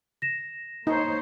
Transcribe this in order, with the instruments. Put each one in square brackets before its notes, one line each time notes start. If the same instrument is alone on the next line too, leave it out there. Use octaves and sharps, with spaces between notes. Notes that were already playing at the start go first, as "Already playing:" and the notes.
[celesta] A#6 E7
[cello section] A#3 C5 C#5 [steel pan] D#4